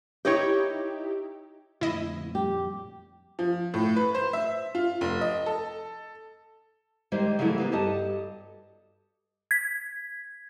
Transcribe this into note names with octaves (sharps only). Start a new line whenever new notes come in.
D#4 E4 G4 C#5 D#5 G5
F2 A#2 D3 A3 E4 D#5
G3 G4
F3
A2
B4
C5
E5
F4
F1
D#5
A4
D#3 G3 G#3 A#3 C5 E5
C#3 E3 F#3 A3 E4
G3 A#3 B3
G2 F#4 G4 A4 D#5 A5
G#6 B6